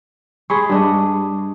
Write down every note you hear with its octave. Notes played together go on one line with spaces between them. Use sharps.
G#3 G#4 B5 C#6
G2 G3 D4 D#5